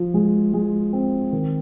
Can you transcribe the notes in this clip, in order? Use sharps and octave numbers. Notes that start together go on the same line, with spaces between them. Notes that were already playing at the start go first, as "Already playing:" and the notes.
Already playing: F3
G#3
G#3
C4
D#3